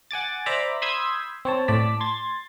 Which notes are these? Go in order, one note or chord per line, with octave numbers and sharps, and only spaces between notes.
F#5 G#5 D6 A6
C5 D5 E5 A#5 B5 D6
B5 C6 D#6 E6 G6 G#6
C4 C#5 A5
A2 D5 A5 B6
C6 G#6 A6